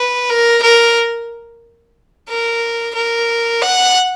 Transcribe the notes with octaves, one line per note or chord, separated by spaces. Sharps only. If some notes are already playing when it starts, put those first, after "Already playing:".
Already playing: B4
A#4
A#4
A#4
A#4
F#5